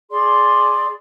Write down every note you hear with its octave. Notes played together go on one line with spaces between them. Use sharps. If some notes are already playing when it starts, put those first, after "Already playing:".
G#4 D5 C6